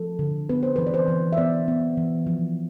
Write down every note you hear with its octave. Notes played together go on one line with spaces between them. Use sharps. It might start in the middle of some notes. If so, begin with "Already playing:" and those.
Already playing: F3 A4
D3
B3 B4
C5
E3 B4
D5
C5
E3
E5
B3 D5
B3
E3
F3